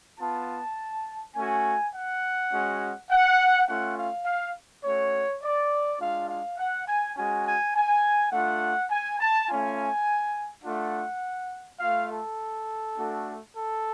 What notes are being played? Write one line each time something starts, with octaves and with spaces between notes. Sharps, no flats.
B3 F4 A5
A3 C#4 F#4 G#5
F#5
G#3 C#4 F#4
F#5
A3 C#4 F4 F#5
F5
F5
A3 C#4 F#4 C#5
D5
G#3 D4 F4 F5
F5
F#5
G#5
G#3 C#4 F#4 G#5
G#5
G#5
A3 D4 F4 F#5
G#5
A5
A3 C#4 F4 G#5
A3 D4 F4 F#5
A3 F4 F5
A4
A3 D4 F#4
A4